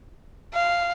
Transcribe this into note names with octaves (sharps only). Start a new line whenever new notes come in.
F5